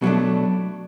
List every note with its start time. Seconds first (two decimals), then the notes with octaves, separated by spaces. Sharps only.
0.02 B2 F#3 A3 D4